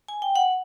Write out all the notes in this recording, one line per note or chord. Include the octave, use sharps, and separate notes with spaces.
G#5
G5
F#5